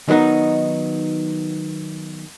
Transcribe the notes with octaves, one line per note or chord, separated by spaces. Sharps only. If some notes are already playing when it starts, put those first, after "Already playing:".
D#3 F#3 B3 D#4